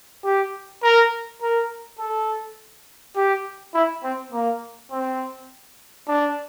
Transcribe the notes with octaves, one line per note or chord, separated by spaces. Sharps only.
G4
A#4
A#4
A4
G4
E4
C4
A#3
C4
D4